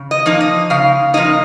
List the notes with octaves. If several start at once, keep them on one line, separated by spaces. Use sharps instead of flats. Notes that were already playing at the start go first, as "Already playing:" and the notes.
Already playing: C#3
D#5
F3 A#3 D#4
D#5
C#3 F5
F3 A#3 D#4 D#5